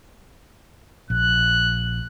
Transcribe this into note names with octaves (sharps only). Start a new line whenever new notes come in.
A#1 F#6